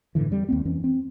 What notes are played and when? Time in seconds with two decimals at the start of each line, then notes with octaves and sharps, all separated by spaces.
0.15 F#2 A2 D3 E3
0.30 F2 G3
0.49 D#2 A#3 C4
0.65 F2 E3 C#4
0.84 C4